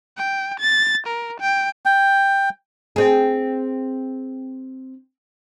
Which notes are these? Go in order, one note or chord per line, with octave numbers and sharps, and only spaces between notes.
G5
A6
A#4
G5
G5
C4 G#4